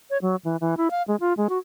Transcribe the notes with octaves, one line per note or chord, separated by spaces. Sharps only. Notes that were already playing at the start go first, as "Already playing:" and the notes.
C#5
F#3
E3
E3
E4
F5
G#3
F4
G#3
F#4